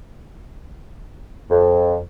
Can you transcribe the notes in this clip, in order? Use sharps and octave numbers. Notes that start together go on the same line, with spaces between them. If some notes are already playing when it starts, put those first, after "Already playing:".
F2